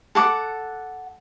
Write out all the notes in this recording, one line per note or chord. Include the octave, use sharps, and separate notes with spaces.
A4 F#5 D6